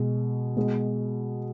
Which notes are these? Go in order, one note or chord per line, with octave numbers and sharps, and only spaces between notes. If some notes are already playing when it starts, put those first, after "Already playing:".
Already playing: B2 G#3
B2 G#3